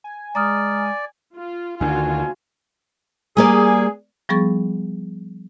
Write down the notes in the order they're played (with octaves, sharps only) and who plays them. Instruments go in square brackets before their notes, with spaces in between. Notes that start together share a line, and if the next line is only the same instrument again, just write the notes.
[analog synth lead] G#5
[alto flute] G#3 [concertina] D5 [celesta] A#5 D#6 F6
[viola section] F4
[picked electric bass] D2 D3 D#3 [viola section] F4 F#4 [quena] G#5
[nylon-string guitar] G3 A#3 D5 [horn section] G#4
[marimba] F3 G3 B3 G#4 C#6 A6